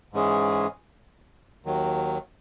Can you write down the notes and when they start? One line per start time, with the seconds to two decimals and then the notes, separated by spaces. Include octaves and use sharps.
0.13 G#2 E3 G#3 C#4 G#4
1.65 D#2 D#3 F#3